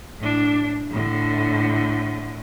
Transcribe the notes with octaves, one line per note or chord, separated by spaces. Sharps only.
A2 D4
A2 D3